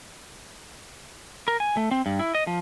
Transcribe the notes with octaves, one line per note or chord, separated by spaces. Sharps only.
A#4
G#5
A3
C4
G2
E4
D#5
F3